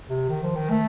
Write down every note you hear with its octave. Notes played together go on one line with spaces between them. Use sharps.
C3
D#3
F3
D#3
A3